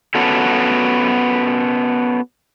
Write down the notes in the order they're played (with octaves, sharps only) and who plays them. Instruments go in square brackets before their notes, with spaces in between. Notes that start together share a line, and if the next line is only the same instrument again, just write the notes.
[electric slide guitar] B3 C#4 F#4 A4